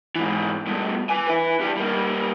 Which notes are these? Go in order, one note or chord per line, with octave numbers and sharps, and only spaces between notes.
G#2 E3
G2 B2
B4 G#5
E4 B4
G2 G3
G3 A#3